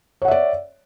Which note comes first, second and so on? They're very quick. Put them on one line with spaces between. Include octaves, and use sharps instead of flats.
C#5 F#5 E5 D5